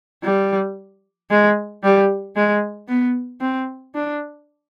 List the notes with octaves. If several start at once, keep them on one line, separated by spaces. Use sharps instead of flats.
G3
G#3
G3
G#3
B3
C4
D4